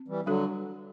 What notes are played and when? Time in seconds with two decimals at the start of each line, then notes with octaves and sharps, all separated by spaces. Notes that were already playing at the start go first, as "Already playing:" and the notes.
Already playing: C4
0.08 E3 G3
0.26 D3 F#3 G3 D4 F#4 A4